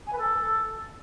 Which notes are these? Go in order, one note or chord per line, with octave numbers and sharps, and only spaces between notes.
G#5
B4
A4